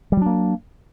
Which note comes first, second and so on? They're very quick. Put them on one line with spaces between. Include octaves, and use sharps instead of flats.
G3 F#3 D4 A#3